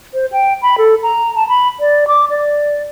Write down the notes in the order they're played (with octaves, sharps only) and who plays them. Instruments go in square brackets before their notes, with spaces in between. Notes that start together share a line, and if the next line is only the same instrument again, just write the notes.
[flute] C5
G5
B5
A4
A#5
A5
B5
D5
D6
D5